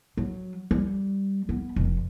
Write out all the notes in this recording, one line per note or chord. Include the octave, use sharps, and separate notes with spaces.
F#3
G3
B3
F1